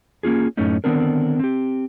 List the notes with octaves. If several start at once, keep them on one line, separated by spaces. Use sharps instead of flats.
A#3 C#4 F4 G#4
F#2 A2 A3 C#4 D#4
D3 D#3 B3 C4 D4 A#4
C4 G4